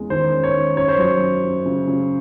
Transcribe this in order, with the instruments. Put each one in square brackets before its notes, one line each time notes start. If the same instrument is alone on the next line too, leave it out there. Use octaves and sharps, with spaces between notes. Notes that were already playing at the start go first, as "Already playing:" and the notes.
Already playing: [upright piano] E2 G#3 C#4
[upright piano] D#3 [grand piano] C5
[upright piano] C#4
[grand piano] C#5
[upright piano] D#3
[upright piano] F#2 [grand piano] C#5
[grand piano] C5
[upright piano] F#3 [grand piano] C#5
[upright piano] F#2
F#2
C#3
C#3